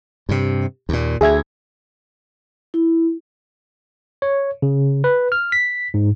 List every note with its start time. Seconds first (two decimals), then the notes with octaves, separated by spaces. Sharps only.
0.29 G2 C3
0.89 D#2 A#2
1.21 D2 G#4 E5 G#6
2.74 E4
4.22 C#5
4.62 C#3
5.04 B4
5.32 F6
5.52 B6
5.94 G#2